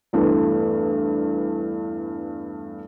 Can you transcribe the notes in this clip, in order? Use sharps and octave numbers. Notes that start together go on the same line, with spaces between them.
E2 G2 A3